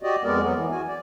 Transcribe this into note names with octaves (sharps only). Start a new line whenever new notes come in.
F#4 G4 D5 D#5
F2 G#3 B3 A#4 D5
F#3 B3
E3
F#4 G#5
D5